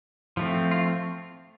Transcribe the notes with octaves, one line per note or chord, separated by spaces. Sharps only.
F3 A3 C4
F4